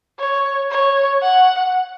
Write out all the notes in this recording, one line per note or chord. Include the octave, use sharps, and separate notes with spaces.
C#5
C#5
F#5